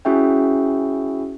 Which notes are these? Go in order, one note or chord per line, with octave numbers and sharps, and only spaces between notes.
C#4 E4 F#4 G#4 E5 G5